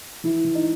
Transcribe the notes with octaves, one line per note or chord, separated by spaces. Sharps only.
E3 E4
E3
D#4